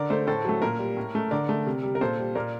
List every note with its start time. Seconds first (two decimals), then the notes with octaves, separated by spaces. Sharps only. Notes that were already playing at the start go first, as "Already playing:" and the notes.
Already playing: D3 A#4 D5
0.10 A3 A4 C5
0.27 A2 A4 C5
0.45 F#3 A3
0.62 A#2 A#4
0.79 G3
0.97 A2
1.15 A3
1.31 D3 A#4 D5
1.49 A3
1.66 C3
1.83 G3
1.95 A#4
2.01 A#2 A4 C5
2.18 G3
2.35 A#2 A#4 D5